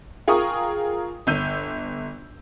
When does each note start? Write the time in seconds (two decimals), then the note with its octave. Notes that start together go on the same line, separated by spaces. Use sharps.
0.28 F4 G#4 A#4 G5 C#6 D#6
1.27 G1 E6 G6 D#7